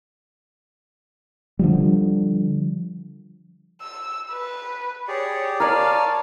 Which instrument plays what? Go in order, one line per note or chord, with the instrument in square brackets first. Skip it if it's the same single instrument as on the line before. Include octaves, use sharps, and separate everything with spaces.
[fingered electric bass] D3 F3 G3
[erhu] E6
B4
[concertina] G4 G#4 D5 [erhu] C#5
[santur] A#4 D5 [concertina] C#5 F5 G#5 [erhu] A5